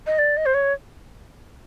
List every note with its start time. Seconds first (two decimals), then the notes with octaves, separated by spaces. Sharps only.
0.06 D#5
0.18 D5
0.37 D#5
0.46 C5
0.54 C#5